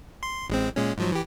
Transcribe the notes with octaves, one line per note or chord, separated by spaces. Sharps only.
C6
A1 G#3 C4
A#2 G#3 C#4
G#2 F3 F#3
E3 G4